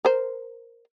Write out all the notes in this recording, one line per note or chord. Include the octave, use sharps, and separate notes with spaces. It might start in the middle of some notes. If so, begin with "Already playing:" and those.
A#4 C5